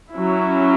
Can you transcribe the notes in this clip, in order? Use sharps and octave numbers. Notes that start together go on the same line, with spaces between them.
F#3 C#4 E4